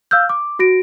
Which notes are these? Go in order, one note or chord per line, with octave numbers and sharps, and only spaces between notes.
F5 E6 F6 G6
D6
F#4 A#6 D7